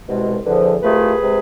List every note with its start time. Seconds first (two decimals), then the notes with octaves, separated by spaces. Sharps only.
0.07 C2 B2 G#3
0.45 E2 D3 F3
0.83 C2 C3 F3 A3 G#4 B4
1.21 C3 G#3